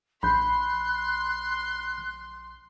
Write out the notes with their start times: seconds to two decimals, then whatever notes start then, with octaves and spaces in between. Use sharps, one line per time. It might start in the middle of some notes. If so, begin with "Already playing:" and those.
0.23 A#1 B5 C6 F#6 G6